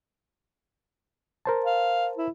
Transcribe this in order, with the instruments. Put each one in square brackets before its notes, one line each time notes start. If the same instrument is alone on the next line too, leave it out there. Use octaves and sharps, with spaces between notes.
[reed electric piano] A#4 C5 A5
[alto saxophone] F5
E4